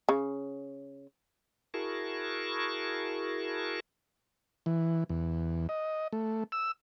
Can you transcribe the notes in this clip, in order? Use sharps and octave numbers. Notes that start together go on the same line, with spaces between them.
C#3
E4 F#4 G#4 A#4 A5 C#6
E3
E2
D#5
A3
E6